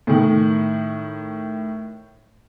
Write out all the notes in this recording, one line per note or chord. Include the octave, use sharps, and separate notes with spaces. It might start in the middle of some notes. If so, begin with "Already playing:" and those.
A2 D#3